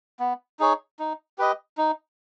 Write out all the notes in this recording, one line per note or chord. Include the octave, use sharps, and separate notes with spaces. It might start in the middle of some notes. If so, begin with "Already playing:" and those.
B3
D#4 G#4 C#5
D#4
G4 B4 D#5
D#4